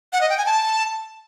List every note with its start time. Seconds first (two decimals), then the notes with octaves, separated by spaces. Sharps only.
0.13 F#5
0.21 D#5
0.29 G5
0.38 G#5
0.46 A5